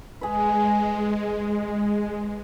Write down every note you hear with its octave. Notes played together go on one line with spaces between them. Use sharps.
G#3 G#4 B4